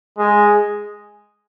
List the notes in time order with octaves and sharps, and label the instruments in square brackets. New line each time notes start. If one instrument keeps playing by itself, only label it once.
[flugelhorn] G#3